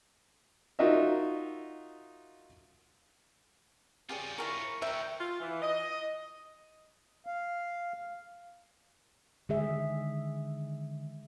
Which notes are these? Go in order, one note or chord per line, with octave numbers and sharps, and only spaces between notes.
D#4 F4 F#4 A#4 D#5 E5
F4 G4 G#4 C#5 D5
E4 G#4 A#4 C#6
D2 A#4 E5 G5
F4
E3
D#5
F5
D3 D#3 G#3 G#4 E5